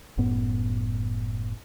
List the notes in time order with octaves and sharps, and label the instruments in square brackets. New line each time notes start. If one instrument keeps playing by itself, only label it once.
[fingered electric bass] F#1 F#2 A2 B3